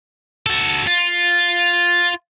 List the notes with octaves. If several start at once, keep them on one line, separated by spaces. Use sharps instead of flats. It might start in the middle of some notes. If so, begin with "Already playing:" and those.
F#4 A4
F4